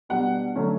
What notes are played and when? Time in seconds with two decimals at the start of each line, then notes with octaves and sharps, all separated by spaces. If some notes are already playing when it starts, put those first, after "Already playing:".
0.09 B2 G3 D4 F#5
0.55 D3 F#3 A3 C#4